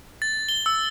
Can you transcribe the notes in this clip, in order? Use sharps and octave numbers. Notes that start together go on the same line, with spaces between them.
A6
G7
E6